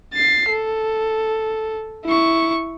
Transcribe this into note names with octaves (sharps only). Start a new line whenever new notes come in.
A6 C7
A4
E4 C#6